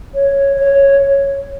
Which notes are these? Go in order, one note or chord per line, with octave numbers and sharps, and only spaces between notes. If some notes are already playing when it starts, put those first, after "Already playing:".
C#5
C#5